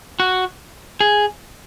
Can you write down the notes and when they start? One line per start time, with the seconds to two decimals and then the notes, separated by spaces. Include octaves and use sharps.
0.20 F#4
1.00 G#4